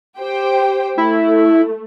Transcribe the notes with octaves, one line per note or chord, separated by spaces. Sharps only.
G4 C5 G5
A3 E4